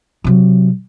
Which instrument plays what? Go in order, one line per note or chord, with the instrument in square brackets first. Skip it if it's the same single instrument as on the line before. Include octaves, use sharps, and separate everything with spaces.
[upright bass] C3 F#3